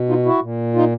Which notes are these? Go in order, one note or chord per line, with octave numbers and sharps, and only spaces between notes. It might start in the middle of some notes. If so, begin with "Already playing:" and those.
Already playing: B2
D#4 F4
E4 F#4
A#2
D#4 F4